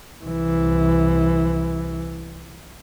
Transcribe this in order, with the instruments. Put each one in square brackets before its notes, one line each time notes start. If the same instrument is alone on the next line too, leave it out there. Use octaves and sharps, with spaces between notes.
[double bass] C2 E3